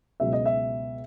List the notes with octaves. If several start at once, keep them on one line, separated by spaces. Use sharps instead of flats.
C#2 B2 F#3 E5
D#5
E5